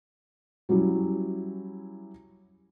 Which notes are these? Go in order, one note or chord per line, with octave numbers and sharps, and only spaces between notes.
F#3 G3 C#4 E4